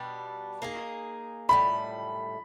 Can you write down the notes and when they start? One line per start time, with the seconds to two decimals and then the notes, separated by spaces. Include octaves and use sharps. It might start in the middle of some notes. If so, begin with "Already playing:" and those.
Already playing: B2 G3 B3 D4
0.62 A#3 D#4 G#4
1.49 A2 E3 G3 B5